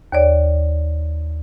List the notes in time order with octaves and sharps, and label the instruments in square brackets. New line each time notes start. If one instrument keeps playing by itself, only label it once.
[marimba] D#2 C#5 D5